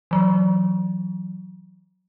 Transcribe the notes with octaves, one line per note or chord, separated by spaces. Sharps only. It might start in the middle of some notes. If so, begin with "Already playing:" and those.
E3 F#3